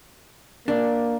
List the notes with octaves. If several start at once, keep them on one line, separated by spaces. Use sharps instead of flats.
A#3 D4